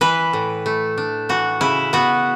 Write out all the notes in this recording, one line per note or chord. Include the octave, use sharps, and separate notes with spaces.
E3 B4
A2
A3
D4
E3 F#4
C#3 E4
B3 F#4